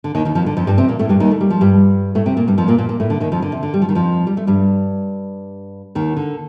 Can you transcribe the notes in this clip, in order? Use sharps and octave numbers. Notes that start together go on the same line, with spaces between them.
D3
D#2 D#3
D#2 D#3
F2 F3
D3
F2 F3
G2 G3
C3 C4
A#2 A#3
A2 A3
G2 G3
D#2 D#3
A3
G3
F3
G2 G3
A2 A3
C3 C4
A#2 A#3
G2 G3
F2 F3
A#2 A#3
A#2 A#3
A#2 A#3
A2 A3
D3
D#2 D#3
F2 F3
D3
C3
D3
G3
F3
D#3
F2 F3
G3
A3
G2 G3
D#2 D#3
D3